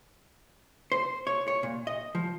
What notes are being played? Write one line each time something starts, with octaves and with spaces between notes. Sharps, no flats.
C5
C#5
C#5
A#2
D#5
F3